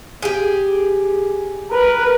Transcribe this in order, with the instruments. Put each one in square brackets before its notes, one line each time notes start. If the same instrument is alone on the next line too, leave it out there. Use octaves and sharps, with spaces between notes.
[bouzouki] G4 G#4
[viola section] A#4 B4